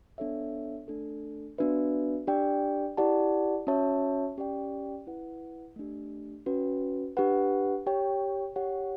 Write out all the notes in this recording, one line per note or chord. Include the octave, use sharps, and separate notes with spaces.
B3 D4 A4 C#5 E5
A3 D4 A4
B3 D4 F#4 B4 E5
D4 G4 D5 G5
E4 G4 D5 F#5 A5
C#4 F#4 C#5 E5 A5
C#4 G4 D5 G5
E4 B4 F#5
A3 D4 G4
C#4 F#4 B4
D4 G4 B4 F#5
G4 C#5 G5
G4 C#5 F#5